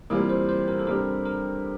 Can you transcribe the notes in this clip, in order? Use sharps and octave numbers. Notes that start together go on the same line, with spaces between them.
C3 E3 G3 A#3 F4 A#4
C5
C5
A#4
A4
C3 G3 D4 G4 A#4
A#4